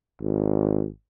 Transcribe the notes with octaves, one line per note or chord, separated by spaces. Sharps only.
G#1